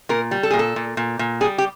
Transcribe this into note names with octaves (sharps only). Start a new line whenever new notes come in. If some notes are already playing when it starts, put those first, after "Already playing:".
A#2 A#4
G3
A4
A#2 G#4
A4
A#2
A#2
A#2
G3 G#4
G4